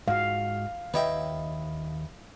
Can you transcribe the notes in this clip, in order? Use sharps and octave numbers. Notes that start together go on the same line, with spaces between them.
G#2 F#4 F5
D#2 B4 C#5 D#5 E5 G5